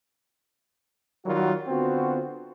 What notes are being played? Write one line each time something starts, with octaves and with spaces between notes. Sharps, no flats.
D#3 F#3 G3 F4 F#4 A#4
D3 B3 C4 F4 F#4